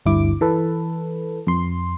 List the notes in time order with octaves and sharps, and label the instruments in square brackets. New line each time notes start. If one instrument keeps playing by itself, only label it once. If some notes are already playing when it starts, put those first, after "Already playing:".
[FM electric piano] G1 D2 G2 E4 D6
E3 A4 B4
F2 C6